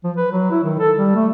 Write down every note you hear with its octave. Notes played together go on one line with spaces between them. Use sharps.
F3
B4
F#3
E4
D#3
A4
G3
A3